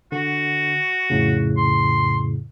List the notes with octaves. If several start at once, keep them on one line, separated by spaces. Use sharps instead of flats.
D3 F#4
F2 A2 C#3
C6